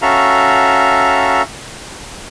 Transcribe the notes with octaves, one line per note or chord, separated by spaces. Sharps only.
C#4 F#4 A4 E5 F5 A#5